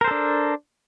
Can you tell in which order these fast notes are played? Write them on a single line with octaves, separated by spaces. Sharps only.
A#4 C5 A4 D4